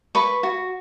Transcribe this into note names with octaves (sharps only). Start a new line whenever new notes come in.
B4 B5 C#6
F#4